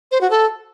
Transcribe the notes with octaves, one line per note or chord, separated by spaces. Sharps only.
C5
F#4
A4